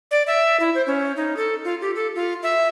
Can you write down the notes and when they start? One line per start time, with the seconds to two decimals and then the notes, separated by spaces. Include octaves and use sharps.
0.11 D5
0.27 E5
0.60 E4
0.75 C5
0.87 C#4
1.16 D#4
1.37 A4
1.64 F4
1.81 G4
1.95 A4
2.15 F4
2.43 E5